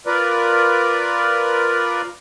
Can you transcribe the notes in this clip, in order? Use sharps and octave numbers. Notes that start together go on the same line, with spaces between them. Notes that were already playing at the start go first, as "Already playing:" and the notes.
F4 A#4 B4 D5